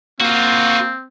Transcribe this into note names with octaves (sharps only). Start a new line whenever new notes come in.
A#3 C4 F4 F#4